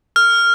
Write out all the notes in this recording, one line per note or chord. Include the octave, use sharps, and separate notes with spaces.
F6